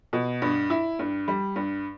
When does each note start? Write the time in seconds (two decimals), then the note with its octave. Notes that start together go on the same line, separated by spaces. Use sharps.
0.13 B2
0.42 G2
0.70 E4
0.99 G2
1.28 G3
1.56 G2